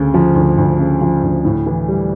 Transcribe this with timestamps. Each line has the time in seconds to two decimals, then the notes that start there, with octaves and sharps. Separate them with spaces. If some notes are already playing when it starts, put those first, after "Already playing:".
Already playing: D2 C#3
0.14 F3
0.35 D2
0.58 D2
0.79 C#3
1.01 F3
1.23 D2
1.45 A2
1.66 E3
1.88 G3